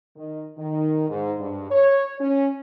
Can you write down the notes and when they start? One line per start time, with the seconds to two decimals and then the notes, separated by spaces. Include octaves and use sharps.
0.16 D#3
0.57 D#3
1.08 G#2
1.39 G2
1.70 C#5
2.20 C#4